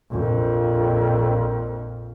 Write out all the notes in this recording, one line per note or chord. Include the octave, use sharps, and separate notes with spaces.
A#1 F2